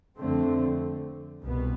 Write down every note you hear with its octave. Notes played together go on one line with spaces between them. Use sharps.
F2 D3 A3 C4
C2 B2 B3